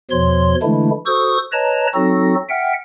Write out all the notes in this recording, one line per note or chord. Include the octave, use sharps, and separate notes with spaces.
E2 B2 F3 C#5 C6
D3 E3 G#3 A3 D4 E4
F#4 A4 C5 C#6 D#6
B4 C#5 D#5 A5 A#5
F#3 C4 D#4 F#4 A4 A#6
E5 F#5 G5 F6